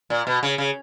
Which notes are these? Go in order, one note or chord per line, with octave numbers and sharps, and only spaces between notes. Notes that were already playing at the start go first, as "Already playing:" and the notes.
A#2
B2
C#3
C#3